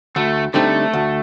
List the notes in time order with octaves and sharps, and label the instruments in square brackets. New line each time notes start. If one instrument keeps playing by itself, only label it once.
[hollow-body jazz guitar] D2 [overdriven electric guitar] A3
[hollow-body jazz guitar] D3 G3 C4 D#4 [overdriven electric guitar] A3
[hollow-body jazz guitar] D2